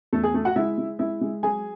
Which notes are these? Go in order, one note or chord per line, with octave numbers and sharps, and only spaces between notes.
E2 A3 A4
G#4
A3 A4
F#4 F#5
G#3 E4 E5
G#3
G#3 E4 E5
G#3
F#3 G#4 G#5